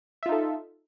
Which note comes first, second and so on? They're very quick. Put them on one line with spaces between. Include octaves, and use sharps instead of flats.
E5 F4 D#4 A4